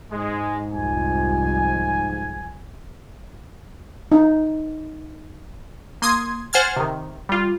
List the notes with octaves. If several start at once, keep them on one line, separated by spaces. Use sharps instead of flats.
G#2 G#3
C2 F2 F3 G#5
D#4
A#3 C6 D#6 G#6
C5 F#5 G#5 F6 G#6 A6
C3 D#3
G3 F4